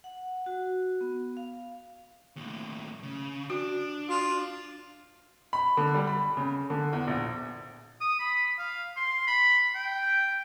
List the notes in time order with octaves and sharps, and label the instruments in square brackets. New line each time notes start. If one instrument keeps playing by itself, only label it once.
[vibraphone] F#5
F#4
B3
F5
[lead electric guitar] D#2 A2
C#3
[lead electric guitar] D4 [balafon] F#4
[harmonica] F4 [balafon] F#4
[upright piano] B5
D3
G3
B5
C#3
D3
E2
A#1
[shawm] D#6
B5
F5
C6
B5
G5